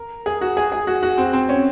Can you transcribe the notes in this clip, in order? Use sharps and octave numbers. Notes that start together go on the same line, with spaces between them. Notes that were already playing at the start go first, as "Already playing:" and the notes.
Already playing: A#4
G#4
F#4
G#4
G#4
F#4
F#4
C4
C4
C#4